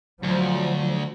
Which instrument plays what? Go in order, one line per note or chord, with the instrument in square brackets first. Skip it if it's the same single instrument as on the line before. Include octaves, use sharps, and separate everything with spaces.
[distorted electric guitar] D2 [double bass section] F3 F#3